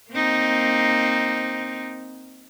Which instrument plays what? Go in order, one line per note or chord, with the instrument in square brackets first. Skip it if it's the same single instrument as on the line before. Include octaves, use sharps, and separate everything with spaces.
[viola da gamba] A#3 C4 D#4